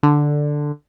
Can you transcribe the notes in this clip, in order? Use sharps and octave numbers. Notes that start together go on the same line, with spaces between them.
D3